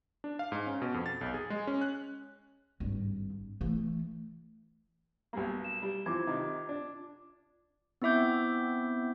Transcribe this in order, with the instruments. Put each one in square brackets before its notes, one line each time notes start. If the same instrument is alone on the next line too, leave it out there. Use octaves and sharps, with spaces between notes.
[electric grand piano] D4
F5
G#2
C#4
B2
F2
A6
B1
G#4
G#3
C#4
F#6
[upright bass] G#1 G2
E3 A3
[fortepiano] B1 G3 A#3
[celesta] E7
[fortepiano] G3
[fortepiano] E3 F3 C4 [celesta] F4 D6 G#6
[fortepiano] C3 D#3
D4
[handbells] B3 C4 E4 E5 D6 G6